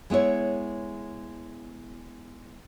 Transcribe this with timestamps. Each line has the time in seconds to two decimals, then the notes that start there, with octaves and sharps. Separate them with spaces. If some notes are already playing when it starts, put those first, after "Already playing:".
0.10 G#3 B3 E4 C#5